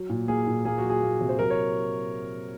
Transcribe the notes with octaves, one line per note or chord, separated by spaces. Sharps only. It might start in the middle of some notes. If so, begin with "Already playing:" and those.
Already playing: F#3
A#2
A#3 G#4
A#2
A#3 G#4
F#4
F#3
G#4
A#3
C3
C5
F#3 A#4
C#5